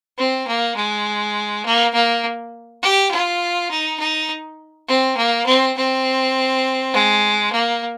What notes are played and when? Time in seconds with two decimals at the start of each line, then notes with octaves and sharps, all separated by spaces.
0.18 C4
0.47 A#3
0.76 G#3
1.65 A#3
1.94 A#3
2.82 G4
3.11 F4
3.71 D#4
3.99 D#4
4.88 C4
5.17 A#3
5.46 C4
5.77 C4
6.94 G#3
7.53 A#3